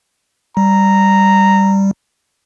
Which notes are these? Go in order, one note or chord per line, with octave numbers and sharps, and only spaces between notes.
G3 A#5